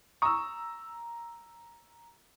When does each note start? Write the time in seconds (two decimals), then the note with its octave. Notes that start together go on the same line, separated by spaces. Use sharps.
0.22 A#5 C#6 D#6 E6